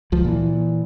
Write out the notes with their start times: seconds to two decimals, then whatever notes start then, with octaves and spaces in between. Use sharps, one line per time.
0.12 C#2 F3
0.25 A#2 E3